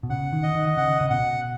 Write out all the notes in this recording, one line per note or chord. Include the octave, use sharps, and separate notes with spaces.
B2
C#3 F#5
D#3
D#5
D#3
C#3 F#5
C#3
B2 F#5